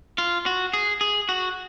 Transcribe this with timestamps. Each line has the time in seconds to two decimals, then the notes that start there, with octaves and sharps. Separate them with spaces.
0.18 F4
0.46 F#4
0.73 G#4
1.01 G#4
1.29 F#4